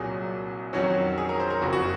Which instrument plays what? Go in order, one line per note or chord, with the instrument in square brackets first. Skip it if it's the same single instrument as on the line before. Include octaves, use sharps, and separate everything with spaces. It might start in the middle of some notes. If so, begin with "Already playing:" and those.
Already playing: [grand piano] C2 A#2 F#3 G#4
F2 D#3 F#3 C#4 F#4
G#4
A#4
C5
A#4
F#1 F2 C#3 F#4
F#4